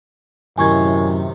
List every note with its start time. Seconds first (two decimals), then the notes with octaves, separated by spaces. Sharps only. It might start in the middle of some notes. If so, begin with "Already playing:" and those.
0.58 F#2 A2 C3 D#3 G#5 C#6 G#6